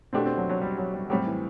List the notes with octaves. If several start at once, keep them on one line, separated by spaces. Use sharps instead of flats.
B2 A3 C4 D4 G4
C4
F#3
F#3
G3
F#3
G3
A2 F#3 G3 C4 G4
E3